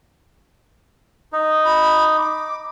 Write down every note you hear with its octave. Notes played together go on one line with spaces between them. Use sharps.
D#4
B5
D6